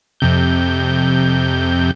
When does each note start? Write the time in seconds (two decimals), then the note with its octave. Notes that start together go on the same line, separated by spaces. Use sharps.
0.20 F2 C3 G6